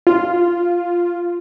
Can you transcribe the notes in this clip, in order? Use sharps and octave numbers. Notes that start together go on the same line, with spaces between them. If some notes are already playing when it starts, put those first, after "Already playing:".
F4